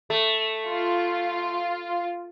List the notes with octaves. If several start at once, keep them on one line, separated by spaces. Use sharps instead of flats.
A3
F4